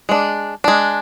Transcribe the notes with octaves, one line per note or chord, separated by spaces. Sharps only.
G#3 D4
G#3 D4